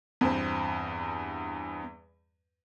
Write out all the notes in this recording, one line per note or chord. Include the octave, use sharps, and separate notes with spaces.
E2 G2 C4